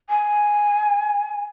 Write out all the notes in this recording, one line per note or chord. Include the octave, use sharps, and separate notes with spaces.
G#5